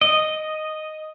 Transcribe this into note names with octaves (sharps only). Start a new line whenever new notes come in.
D#5